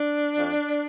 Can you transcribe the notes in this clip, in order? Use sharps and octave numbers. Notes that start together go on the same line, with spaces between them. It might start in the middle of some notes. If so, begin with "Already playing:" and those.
Already playing: D4
F2